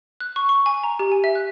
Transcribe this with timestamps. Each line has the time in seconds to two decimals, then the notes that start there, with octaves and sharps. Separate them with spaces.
0.20 F#6
0.36 C#6
0.49 C#6
0.66 G#5
0.84 A#5
0.99 G4
1.12 G#5
1.24 E5
1.35 F#6